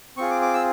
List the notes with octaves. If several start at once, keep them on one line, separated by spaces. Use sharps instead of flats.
C4 F4 G#4 C#6
D6
D6
E6